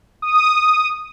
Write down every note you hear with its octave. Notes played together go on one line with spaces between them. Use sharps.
D#6